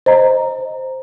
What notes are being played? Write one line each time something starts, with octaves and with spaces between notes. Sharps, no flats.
C5 D#5 A#5